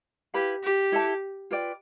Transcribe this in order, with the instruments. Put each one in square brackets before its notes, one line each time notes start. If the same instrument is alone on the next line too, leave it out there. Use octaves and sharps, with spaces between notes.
[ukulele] E4 B4 F5 B5 [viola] G4
[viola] G4
[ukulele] E4 A4 E5 A5
F4 B4 D5 G5